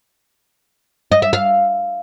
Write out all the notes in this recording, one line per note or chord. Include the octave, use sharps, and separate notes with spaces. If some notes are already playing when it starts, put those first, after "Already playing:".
D#5
E5
F5